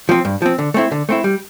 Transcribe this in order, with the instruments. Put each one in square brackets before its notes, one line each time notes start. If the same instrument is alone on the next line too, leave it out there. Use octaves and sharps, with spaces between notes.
[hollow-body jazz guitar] F3 C4
G2
F3 C4
D3
A3 C4 E4
D3
A3 C4 E4
G3